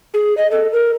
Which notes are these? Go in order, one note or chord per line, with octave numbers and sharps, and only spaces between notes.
G#4
D#5
A4
A#4